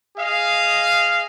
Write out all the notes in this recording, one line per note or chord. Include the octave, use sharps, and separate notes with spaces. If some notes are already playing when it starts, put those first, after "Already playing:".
G#4 D#5 F5